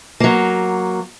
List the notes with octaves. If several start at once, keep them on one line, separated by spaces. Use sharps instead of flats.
F#3 A#3